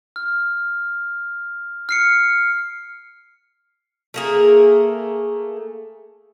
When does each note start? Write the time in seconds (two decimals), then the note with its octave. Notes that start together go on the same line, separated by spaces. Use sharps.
0.16 F6
1.89 F6 C7 C#7
4.14 A3 A#3 G#4